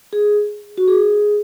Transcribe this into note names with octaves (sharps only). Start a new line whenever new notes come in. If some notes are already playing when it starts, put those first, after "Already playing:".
G#4
F#4
G#4